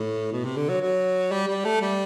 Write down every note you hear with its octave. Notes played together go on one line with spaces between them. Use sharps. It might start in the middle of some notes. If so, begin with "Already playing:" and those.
Already playing: A2
B2
C3
D3
F#3
F#3
G3
G3
A3
G3